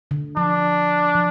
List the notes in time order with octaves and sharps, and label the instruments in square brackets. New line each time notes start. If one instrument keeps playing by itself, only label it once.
[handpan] D3
[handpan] F3 [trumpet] D4
[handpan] F3